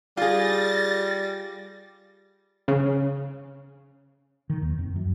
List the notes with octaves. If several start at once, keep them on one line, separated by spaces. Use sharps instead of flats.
G3 F4 G#4 A6 A#6
C#3
D#3
D#2
F2
F#2